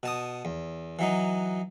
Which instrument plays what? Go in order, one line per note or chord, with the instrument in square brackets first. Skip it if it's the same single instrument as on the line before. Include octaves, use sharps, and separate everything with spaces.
[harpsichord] B2 A5 D#6
E2
E3 F#3 D#4